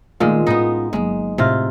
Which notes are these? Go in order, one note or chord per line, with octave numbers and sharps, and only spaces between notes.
A#2 D#3 G#3 A3 F4
A2 B3 C#4 D#4
G1 F#3 G#3 A#3
A2 C3 F4